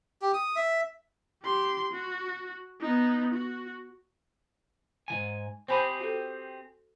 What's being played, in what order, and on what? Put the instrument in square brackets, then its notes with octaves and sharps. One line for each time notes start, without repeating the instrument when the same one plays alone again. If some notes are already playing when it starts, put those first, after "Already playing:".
[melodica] G4
D#6
E5
[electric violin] G4 C6
F#4
B3 D#4
F#4
[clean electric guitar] G#2 E3 G#5
[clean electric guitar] C4 G4 G#4 [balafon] C5 G#5 B5
[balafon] F#4 A4